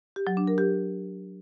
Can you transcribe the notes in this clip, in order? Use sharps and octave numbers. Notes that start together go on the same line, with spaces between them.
G4
F#3
D4
A#4
G4